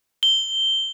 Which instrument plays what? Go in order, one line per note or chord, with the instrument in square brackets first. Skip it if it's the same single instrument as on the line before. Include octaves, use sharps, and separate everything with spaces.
[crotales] G7